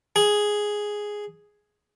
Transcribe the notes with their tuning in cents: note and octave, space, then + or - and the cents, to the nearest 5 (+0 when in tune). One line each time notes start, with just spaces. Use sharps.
G#4 +0